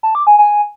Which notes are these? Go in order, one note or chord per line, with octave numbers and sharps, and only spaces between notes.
A5
D6
G#5
G#5